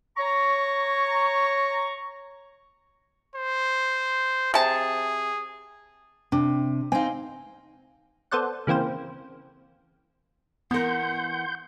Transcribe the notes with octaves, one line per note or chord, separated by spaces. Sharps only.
C#5 A#5 C#6
C5
C3 G#4 A5
C3 D4
C4 D#4 F5 G#5
B3 A4 C5 D5 F#5
C#3 E3 A#3 C4 C5
E3 B3 A#4 F#5 C6 G6